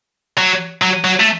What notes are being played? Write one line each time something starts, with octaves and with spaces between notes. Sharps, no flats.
F#3
F#3
F#3
A3